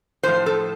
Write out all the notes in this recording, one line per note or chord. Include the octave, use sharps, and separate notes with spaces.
A2 F3 C5
A4